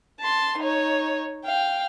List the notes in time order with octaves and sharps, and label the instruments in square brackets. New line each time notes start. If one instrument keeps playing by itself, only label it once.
[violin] A5 C6
D#4 C#5
F5 G5